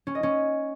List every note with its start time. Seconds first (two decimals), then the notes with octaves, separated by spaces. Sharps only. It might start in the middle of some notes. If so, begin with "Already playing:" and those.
0.07 C#4
0.15 D#5
0.23 C#4